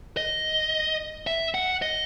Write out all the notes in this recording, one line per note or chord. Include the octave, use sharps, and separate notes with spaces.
D#5
E5
F#5
D#5